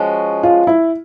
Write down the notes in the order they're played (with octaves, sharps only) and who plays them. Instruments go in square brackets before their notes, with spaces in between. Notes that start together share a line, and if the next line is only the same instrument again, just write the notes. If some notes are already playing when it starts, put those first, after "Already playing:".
Already playing: [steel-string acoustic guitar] F3 G#3 C#4 F#4
[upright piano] F4
E4